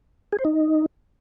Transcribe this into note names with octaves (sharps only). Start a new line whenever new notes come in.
G#4
C5
D#4